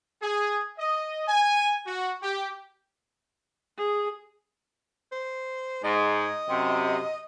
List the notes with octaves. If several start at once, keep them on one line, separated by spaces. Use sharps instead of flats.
G#4
D#5
G#5
F#4
G4
G#4
C5
G#2 D#5
F#2 C3